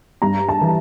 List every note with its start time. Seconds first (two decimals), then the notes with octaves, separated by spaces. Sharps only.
0.22 G2 A#5
0.49 A5
0.61 E3